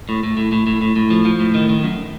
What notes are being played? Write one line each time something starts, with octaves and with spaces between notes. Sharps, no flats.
A2
A2
A2
A2
A2
A2
A2
F3
F3
A2
D#3
D#3
F#2